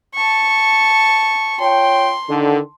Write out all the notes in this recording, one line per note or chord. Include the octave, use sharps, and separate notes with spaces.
A5 C#6
F4 C#5 G5 C6
D3 D#3